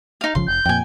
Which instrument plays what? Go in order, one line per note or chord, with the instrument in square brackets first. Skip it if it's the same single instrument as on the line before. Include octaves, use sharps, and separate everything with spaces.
[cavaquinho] D#4 F5
[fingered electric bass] G#1 C#3 F3 [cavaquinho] C6
[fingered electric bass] F1 [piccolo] G6
[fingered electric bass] F2 A#2 [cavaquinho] G5 G#5